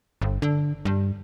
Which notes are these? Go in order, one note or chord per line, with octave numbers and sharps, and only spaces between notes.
G1
D3
G2